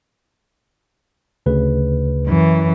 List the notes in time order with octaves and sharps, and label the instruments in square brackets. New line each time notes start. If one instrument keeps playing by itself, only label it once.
[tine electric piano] D2 C#3 B4
[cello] F#2 E3